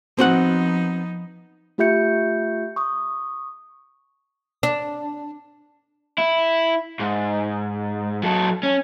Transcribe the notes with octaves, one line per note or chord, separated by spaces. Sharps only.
F3 B3 C4 D#4 F#4 F#5
A3 F4 G4 E5 G6 C#7
C#6 D#6
D4
E4
G#2
F#3 A4
C#4